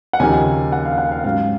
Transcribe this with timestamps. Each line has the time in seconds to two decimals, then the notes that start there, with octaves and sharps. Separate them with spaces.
0.13 F#5
0.20 D#2 C#3 F3 A#3 D#4 G#5
0.72 F#5
0.85 F5
0.98 F#5
1.12 F5
1.24 G#2 F#3 C#4 F5